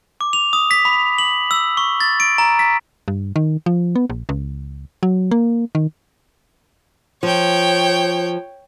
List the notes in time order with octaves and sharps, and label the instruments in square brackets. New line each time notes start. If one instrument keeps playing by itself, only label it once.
[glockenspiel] D6
F7
D#6
B6
B5
F#7
E6
C#6
A6
D7
A#5
B6
[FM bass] G2
D#3
F3
B3
A#1
C#2
F#3
A#3
D#3
[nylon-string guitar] F3 [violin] C#5 G5